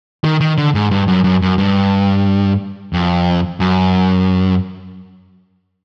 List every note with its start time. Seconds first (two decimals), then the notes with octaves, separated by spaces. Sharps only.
0.24 D#3
0.41 D#3
0.58 D3
0.75 G#2
0.91 G2
1.08 F#2
1.24 F#2
1.42 F#2
1.58 G2
2.93 F2
3.60 F#2